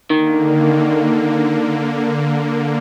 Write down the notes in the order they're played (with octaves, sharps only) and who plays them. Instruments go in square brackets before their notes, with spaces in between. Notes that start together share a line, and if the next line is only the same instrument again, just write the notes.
[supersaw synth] D3 A#3 [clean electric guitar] D#3